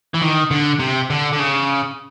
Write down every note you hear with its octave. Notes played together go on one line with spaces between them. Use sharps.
E3
D#3
D3
C3
D3
D3
C#3